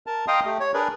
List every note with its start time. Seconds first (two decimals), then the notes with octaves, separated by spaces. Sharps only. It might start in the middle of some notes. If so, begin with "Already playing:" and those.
0.07 A#4 A5
0.28 D#5 F5 G5 A#5 C6 D#6
0.45 A3 G4
0.60 C#5
0.74 D4 G#4 A#4 B4 D5